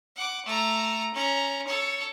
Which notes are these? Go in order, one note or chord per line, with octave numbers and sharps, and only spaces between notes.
F#5 D6
A3 A#5
C#4 A#5
A4 C#5